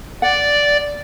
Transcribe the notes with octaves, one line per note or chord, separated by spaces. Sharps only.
D5 F#5